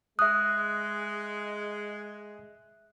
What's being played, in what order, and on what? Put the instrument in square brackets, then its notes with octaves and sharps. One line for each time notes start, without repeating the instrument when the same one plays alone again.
[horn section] G#3 [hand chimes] E5 F#6 [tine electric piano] D#6